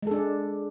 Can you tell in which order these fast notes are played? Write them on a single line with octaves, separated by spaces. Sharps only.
G#3 A4 D4